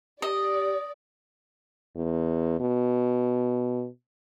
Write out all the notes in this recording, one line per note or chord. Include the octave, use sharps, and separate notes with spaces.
G4 D5 D#5
E2
B2